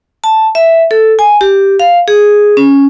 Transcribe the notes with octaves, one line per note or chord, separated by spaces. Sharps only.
A5
E5
A4
G#5
G4
F5
G#4
C#4